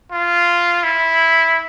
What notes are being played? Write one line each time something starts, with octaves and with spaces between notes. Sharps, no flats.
F4
E4